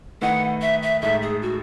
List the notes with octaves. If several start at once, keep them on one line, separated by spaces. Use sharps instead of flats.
D#3 A3 E4 B4 D#5 F#5
E5
E5
A2 G#3 D#4 A4 E5
G#4
F#4